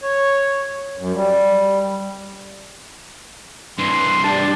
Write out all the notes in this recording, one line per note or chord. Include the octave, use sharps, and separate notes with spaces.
C#5
F#2
G3
G2 E3 C6
G3 D4 A5